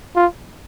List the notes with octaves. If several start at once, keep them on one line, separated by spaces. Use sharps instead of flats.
F4